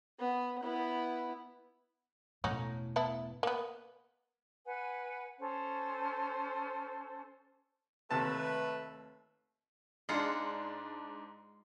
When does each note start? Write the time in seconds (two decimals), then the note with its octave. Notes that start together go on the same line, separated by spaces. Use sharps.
0.19 B3
0.63 B3 E4
2.44 E1 A2 C#4 D#4 F#4
2.96 B3 E4 A4
3.43 A#3 B3
4.65 B4 F#5 G#5
5.39 C#4 A4 C5
8.11 D#2 C3 A3 B4 A5
10.09 G#2 G#3 D4 F4 F#5